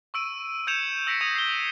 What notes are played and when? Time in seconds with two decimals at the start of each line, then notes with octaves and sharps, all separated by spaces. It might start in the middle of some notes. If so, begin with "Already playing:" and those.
0.14 C#6 E6 D7 D#7
0.67 E6 G6 G#6 C#7 E7 F7
1.07 E6 A#6 B6 C#7 D7 F7
1.21 D#6 G#6 A#6 D#7 F7
1.35 C7 G7